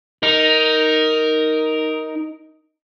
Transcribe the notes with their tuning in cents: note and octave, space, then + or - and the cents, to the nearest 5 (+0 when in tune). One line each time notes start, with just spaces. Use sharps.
D#4 +10 A#4 +0